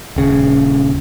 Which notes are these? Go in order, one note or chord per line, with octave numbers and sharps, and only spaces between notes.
D#1 C#3